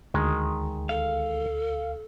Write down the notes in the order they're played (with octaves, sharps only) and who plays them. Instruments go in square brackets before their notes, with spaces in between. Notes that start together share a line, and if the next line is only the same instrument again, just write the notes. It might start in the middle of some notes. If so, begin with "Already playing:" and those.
[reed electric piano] D2 [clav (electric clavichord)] D#3 G#3
[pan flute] A4 [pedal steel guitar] F5